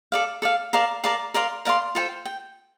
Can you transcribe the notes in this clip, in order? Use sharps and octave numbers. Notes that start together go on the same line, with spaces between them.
A4 D5 F5
A4 D5 F5
A#4 D5 F5 A5
A#4 D5 F5 A5
A#4 D5 F5 C6
A#4 D5 F5 C6
F4 A4 C5 G5
G5